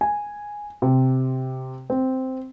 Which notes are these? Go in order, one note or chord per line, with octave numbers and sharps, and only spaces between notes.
G#5
C3
C4